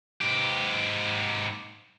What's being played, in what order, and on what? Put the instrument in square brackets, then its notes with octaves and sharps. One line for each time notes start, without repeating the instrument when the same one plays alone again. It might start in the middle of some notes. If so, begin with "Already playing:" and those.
[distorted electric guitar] G#2 G4